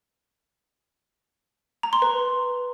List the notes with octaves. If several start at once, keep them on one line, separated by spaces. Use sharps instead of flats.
A#5
C6
B4